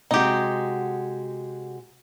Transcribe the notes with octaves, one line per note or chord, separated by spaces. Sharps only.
C3 G#3 D#4 F#4 G4